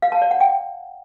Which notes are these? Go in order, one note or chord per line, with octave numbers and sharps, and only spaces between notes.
F5
A5
D5
F#5
G5